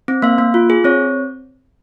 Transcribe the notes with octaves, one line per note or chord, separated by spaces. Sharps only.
C4
A#3 F5
A#3
F4
G#4
C4 C#5